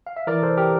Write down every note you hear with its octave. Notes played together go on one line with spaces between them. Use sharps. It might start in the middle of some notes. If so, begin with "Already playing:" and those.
F5
E5
E3 A#4 D5
C3 A4 C5
G4 A#4